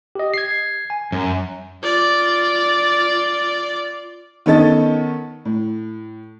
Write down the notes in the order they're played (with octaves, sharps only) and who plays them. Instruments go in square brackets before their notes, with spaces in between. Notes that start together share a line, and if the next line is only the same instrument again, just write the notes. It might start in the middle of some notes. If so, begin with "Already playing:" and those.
[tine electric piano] G4 D#5
G#6 C7
G#5
[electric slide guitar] F#2
[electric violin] F4 D5
[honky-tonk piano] D#3 B3 C#4 A4 D#5 A6
A2